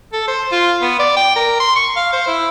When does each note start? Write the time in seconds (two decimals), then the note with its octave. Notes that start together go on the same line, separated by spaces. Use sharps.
0.13 A4
0.28 C5
0.52 F4
0.82 B3
1.00 D5
1.17 G5
1.36 A#4
1.60 C6
1.76 C#6
1.96 F5
2.13 C5
2.27 E4